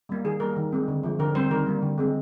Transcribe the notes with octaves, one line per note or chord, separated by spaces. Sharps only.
G3 A#3
D#3 G#4
G3 A#3 A#4
D#3
G#3 C4
D3
F3 G#3
D3 A#4
G3 C4 C5
D#3 A#4
G3 A#3
D3
G#3 C4